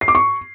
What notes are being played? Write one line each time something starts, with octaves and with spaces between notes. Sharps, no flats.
C7
D6
C#6